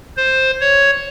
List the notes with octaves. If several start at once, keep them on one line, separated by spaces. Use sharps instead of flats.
C5
C#5